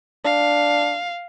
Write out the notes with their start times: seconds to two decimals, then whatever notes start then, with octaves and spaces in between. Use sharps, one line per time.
0.25 D4 F5